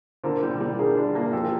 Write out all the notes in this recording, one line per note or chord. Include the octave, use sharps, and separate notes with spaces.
D3 A#4 C5
G3
G3
D3 G#4 A#4
D4
A#3
F3 G4 A4